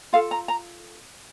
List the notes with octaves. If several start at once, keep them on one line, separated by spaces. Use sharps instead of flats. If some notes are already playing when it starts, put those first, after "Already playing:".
F4 A4 F5
A#5
A#5